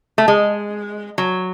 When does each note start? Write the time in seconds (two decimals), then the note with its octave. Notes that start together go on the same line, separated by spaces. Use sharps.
0.18 A3
0.28 G#3
1.18 F#3